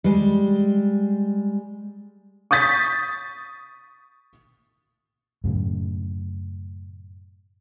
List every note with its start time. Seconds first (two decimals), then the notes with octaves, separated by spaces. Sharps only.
0.04 G3 G#3
2.51 C#6 D#6 G6 A6 B6
5.44 F#2 A2 C#3